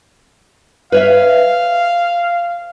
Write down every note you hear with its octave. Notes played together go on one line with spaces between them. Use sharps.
B4 C#5 E5 F5